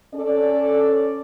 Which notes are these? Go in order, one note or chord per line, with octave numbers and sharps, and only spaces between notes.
C#4 A4 D5